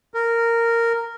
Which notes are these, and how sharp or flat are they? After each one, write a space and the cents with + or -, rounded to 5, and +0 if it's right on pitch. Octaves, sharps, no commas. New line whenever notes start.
A#4 -10